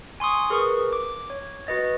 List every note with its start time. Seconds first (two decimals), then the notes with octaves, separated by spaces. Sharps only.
0.20 G#5 C6 C#6 D#6
0.50 G#4 A#4 B4 C#6
0.93 D6
1.30 C#5
1.67 F#4 B4 D#5 A6